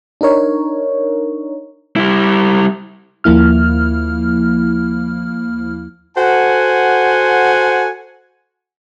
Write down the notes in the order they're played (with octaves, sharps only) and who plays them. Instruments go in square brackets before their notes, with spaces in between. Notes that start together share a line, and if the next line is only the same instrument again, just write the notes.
[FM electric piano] D4 D#4 A#4 C#5
[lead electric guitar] G3 E4
[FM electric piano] D#2 F3 A#3 E4 F6
[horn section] F#4 A4 C5 F#5 G#5